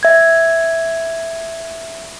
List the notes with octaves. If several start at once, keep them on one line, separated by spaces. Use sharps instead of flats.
E5 G#6